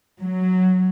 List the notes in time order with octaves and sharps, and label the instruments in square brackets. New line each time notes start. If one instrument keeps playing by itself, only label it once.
[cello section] F#3